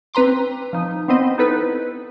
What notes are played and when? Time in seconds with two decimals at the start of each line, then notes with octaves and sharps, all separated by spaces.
0.14 C4 B4 A#5 C6 D6
0.73 F3 D#4
1.08 B3 C4 C5 D#5
1.38 D#4 E4 A4 B4